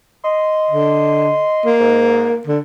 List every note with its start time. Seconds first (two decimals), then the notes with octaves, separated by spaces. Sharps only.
0.25 D#5 C6
0.71 D3
1.66 A#3
1.80 G#2
2.47 D3